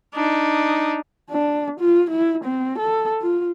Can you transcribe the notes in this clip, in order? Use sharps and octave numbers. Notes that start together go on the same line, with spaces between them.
D4 D#4
D4
F4
E4
C4
A4
F4